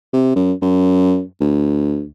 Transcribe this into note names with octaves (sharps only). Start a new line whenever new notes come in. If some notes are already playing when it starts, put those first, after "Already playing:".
C3
F#2
F#2
D2